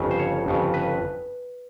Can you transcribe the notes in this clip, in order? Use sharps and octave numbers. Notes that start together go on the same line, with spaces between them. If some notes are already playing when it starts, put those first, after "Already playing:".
Already playing: G1 F2 C#3
C5
C#5
G1 F2 C#3
B4